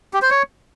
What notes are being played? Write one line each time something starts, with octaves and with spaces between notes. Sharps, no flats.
G4
C5
C#5